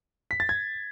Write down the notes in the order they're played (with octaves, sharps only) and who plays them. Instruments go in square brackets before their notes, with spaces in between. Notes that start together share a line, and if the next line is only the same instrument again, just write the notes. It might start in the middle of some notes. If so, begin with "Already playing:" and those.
[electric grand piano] B6
A6
G#6